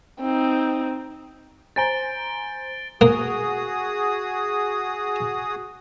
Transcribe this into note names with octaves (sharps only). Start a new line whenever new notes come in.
C4 D#4
C5 G#5 A#5 A6 D7 G7
A#3 F#4 G#4 D#6